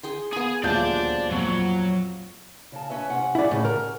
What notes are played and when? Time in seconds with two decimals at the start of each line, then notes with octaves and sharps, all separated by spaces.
0.03 G#4 G5 C6
0.33 B3 G#4 B5
0.63 D#1 D2 F3 G#3 D5 A5 G6
1.31 F2 A#2 F#3
2.72 C#3 A5
2.90 C#4 B4 E5
3.10 C3 C#4 F#5
3.35 E4 D5
3.51 A2 C#3
3.65 A#4